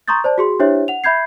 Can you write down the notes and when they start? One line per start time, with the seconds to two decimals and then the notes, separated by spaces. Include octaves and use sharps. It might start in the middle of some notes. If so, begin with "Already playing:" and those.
0.08 A#5 C6 C#6 D#6 G6 A6
0.24 C5 D5 A5
0.38 F#4 G#4 C6
0.60 D4 E4 G4 C5 C#5 E5
0.88 F#5 F7
1.04 E5 B5 G6 G#6 C7